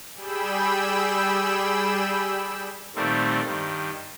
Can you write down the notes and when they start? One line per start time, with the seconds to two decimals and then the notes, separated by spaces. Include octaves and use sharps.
0.15 G3 G#4 G5 B5 E6 E7
2.96 A#2 D#3 G3 A3 C4
3.46 G2 D#3